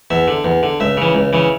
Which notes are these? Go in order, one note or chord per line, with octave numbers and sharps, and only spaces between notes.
E2 E5
D3
E2
D3
C#2 E5
C#3 E3
C#2
C#3 E3